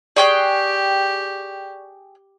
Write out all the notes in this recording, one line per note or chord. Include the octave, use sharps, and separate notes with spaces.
G4 G#4 D5 G5 C#6 F#6 G7